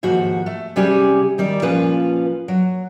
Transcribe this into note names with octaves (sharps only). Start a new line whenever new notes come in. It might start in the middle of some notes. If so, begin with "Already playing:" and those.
D#2 G#2 F3 F#4
A3
C3 G3 C#4 G4 G#4
D#3 G3 D5
A#2 F3 C#4 F4 B4
F#3